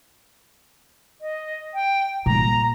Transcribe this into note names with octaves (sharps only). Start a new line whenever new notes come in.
D#5
G5
A#2 G3 A#5